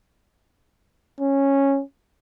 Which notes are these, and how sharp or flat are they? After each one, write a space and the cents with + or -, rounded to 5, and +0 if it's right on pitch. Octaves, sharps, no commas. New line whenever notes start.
C#4 -10